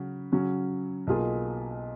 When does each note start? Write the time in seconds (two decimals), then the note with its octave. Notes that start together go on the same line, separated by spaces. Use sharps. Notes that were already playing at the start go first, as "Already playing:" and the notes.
Already playing: C#3 F#3 C#4 F#4
0.32 C#3 F#3 C#4 F#4
1.07 B1 B2 A#3 F4 G#4